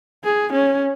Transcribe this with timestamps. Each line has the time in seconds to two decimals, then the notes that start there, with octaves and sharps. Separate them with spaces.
0.24 G#4
0.53 C#4